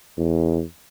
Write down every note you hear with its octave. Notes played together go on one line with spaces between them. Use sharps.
E2